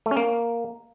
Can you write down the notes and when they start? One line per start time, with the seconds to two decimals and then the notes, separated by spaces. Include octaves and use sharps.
0.06 A3
0.11 C#4
0.17 A#3